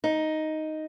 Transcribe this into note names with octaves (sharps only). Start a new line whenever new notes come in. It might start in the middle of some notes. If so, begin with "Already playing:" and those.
D#4